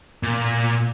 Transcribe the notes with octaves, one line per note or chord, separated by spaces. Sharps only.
A#2